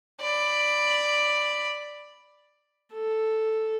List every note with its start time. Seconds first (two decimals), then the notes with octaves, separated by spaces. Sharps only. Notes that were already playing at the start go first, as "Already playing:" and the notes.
0.21 D5 B5
2.94 A4